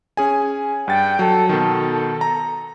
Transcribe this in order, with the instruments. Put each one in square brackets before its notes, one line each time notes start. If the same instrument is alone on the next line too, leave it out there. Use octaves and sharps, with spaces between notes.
[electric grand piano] C#4 G#4 G#5
[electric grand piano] G2 A6 [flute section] F#5 G5
[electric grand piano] F#3 [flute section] A4
[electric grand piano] B2 D#3 [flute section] A4
[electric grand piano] A#5